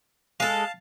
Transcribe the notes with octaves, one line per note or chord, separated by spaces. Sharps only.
G#3 A4 F5 A5